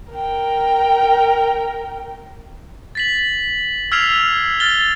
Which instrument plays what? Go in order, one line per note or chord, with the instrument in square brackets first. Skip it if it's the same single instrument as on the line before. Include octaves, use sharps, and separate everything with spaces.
[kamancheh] A#4 G5
[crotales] A6 B6 F#7
E6 F6 G#6 B6 C7 F7
F6 A6 G7